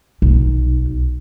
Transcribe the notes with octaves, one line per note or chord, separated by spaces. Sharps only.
B1